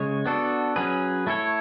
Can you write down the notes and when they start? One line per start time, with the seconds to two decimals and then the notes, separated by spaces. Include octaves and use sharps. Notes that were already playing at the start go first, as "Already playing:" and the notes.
Already playing: C#3 G#3 C#5
0.26 B3 D4 F#4 A4
0.76 F#3 C#4 G#4 B4
1.27 A3 E4 A4 C#5